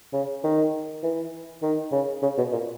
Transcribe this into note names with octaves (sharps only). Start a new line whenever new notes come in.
C#3
D#3
E3
D#3
C#3
C#3
B2
A#2